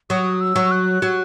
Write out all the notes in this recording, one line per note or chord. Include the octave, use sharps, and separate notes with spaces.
F#3 D#6
E6
F#3
F#6
F#3